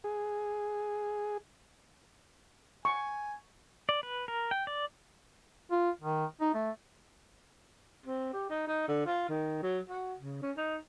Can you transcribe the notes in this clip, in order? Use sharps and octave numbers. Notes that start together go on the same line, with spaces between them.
G#4
G#5 C#6
D5
B4
A#4
G5
D5
F4
D#3
D#4
A3
C4
G4
D#4
D#4
D3
F4
D#3
F#3
F#4
C#3
C#4
D#4